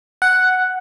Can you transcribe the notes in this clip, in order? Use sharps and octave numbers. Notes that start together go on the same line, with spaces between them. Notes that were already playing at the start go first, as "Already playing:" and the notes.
F#5